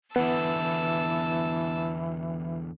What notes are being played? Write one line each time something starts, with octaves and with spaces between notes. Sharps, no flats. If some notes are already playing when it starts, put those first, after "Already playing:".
E2 D3 E3 B3 A5 E6